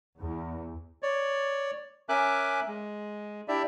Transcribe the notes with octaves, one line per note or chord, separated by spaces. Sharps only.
E2
C#5 D5
C#4 A#4 E5 G#5 D6 F#6
G#3
D4 E4 G4 D5 E5